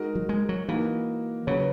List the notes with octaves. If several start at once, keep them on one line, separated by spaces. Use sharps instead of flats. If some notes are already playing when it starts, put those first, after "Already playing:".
Already playing: G#3 D#4 F#4 A#4
F#3
G#3
F#3
E3 A#3 D#4 F#4 A#4
C#3 F#3 C#4 F#4 B4